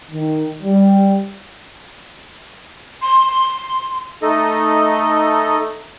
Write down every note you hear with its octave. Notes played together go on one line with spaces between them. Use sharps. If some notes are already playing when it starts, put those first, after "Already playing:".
D#3
G3
C6
A3 D#4 A4 D#5